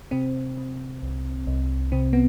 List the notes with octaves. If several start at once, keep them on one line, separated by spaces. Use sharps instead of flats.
C3 C4
C3
C2
C2
C3 C4
B3